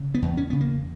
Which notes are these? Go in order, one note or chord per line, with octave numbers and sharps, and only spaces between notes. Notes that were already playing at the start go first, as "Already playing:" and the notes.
Already playing: C#3
B3
E2
C#4
C#3 B3
A#3